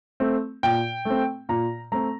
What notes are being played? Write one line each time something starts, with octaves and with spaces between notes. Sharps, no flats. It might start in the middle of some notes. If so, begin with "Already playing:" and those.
A3 C4
A#2 G5
A3 C4
A#2 A#5
A3 C4 A#5